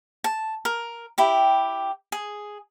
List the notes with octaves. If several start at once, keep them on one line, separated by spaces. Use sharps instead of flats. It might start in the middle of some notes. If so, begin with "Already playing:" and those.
A5
A#4
E4 G4 G5
G#4